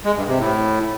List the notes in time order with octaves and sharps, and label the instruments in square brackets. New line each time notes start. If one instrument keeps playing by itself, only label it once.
[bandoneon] G#3
G2
C3
A2